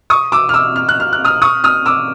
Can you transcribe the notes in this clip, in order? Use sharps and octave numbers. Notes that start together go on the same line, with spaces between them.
C#6 D#6
D6 E6
F6
D6 E6
F6
F#6
F6
F#6
D#6 F6
C#6 D#6
D#6 F6
D6 E6